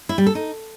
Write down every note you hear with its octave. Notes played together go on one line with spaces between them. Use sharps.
E4
G3
A4
D#4